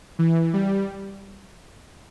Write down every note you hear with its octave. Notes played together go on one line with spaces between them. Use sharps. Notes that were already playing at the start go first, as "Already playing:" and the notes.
E3
G3